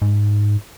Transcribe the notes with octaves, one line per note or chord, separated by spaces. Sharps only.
G#2